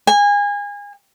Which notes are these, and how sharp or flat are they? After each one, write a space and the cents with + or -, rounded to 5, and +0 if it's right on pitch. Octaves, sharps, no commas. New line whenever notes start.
G#5 -30